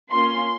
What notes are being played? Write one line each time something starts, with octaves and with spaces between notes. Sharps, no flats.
A#3 C#4 F4 C6